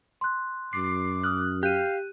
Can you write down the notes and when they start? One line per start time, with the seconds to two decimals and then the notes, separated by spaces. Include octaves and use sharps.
0.21 C6 F#6
0.73 F#2 D6 C7
1.24 D#6 F6 F#6
1.63 G4 F5 F#6 D#7